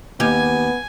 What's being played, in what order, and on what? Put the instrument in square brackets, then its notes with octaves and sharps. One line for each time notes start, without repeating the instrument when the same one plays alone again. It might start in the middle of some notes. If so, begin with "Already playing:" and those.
[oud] D#2 G4 [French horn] B3 [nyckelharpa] G#5